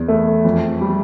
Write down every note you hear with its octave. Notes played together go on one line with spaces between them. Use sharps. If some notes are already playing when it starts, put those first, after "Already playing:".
Already playing: E2
A3
F2
G3